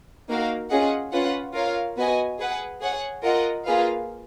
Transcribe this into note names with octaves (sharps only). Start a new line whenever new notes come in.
A#3 D#4 F#4 A#4 F5
C#4 F4 G#4 D#5 F#5
C#4 F4 B4 F#5
F4 A#4 C#5 F5
B3 F#4 B4 D#5 G#5
G#4 B4 F#5
G#4 C#5 F#5
F4 A#4 D#5 F#5
A#3 F4 G#4 B4 F5